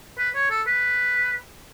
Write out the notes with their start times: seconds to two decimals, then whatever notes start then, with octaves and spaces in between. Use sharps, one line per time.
0.18 B4
0.35 C#5
0.50 A4
0.67 B4